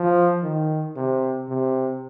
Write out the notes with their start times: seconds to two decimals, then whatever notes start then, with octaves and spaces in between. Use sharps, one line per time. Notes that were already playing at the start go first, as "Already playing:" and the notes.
Already playing: F3
0.43 D#3
0.96 C3
1.49 C3